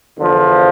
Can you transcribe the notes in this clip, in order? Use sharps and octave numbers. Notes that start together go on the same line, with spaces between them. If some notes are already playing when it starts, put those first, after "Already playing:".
E2 D3 F3